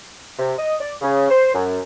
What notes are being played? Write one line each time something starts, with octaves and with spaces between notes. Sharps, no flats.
C3
D#5
D5
C#3
C5
F#2